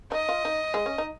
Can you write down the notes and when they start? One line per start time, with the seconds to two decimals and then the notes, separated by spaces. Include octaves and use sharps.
0.12 D#4 D#5
0.29 F4
0.45 D#4
0.74 G#3
0.86 C#4
0.98 D#4